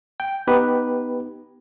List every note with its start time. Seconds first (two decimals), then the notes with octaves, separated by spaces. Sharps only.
0.20 G5
0.47 B3 D#4 G4 B4